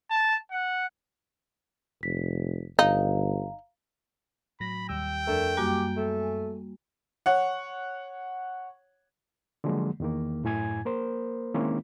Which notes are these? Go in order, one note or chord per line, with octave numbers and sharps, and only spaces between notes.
A5
F#5
F1 B6
G1 D#4 F5 A#5
A2 F#3 B5 A#6
D#2 G3 G5 E6
F2 A3 D4 A#4
F#2 G3 A#3 F#4 G4 G#5
A3
C#5 F#5
D3 F3 F#3 G#3 A#3
E2 D#3 A#3
F#2 A2 E4 G#5 G#6
A#3 A#4 C5
D#3 G#3 A#3 C4 C#4 E4